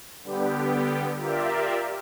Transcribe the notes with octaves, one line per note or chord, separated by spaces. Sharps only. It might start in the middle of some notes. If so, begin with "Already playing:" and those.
D3 G3 B3 G4
F4 G4 A#4 D5 E5